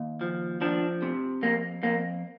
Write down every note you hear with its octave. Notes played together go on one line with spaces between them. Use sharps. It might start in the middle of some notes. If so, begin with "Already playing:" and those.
Already playing: D#2
F3
F3 D4
C3
F2 A#3
F2 A#3